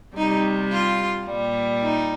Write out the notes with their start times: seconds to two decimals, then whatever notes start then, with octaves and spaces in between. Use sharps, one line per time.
0.15 C3 G3 D#4
0.71 F4
1.27 A#2 G3
1.82 D#4